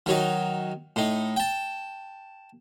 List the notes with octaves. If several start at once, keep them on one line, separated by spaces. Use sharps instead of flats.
D#3 F#3 D#4
A2 D#4
G5 A5